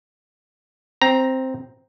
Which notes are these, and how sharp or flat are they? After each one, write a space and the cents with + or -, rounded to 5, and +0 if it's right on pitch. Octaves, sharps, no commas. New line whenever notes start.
C4 +0 A#5 +5